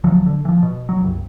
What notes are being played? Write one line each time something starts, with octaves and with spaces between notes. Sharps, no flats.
D#1 D2 F3 F#3
D3
E3 F3
B2
F#3
F#1 C2